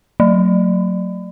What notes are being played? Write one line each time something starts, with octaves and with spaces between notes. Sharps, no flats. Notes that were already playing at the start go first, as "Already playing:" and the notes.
F#3